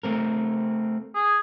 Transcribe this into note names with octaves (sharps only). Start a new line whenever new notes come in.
A3 C4 A#4
G#4